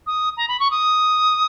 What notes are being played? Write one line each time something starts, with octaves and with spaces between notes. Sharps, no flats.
D#6
A#5
B5
C#6
D#6